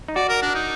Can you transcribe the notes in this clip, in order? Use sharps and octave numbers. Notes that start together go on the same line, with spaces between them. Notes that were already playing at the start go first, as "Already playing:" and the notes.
D#4
F#4 D5
A#4
D4
D#4